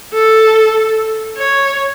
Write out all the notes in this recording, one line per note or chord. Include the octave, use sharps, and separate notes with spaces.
A4
C#5